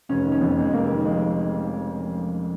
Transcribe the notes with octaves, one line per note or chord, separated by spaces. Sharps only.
F1 C#4
D#3
C#4
F2 B3
F2
G#3
F1 A#3
D#3
F1 G#3